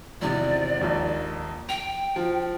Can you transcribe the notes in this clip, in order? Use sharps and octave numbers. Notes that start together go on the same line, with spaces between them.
G#1 E2 C3 D5
A#1 D#2 G#2
G5 F7
F3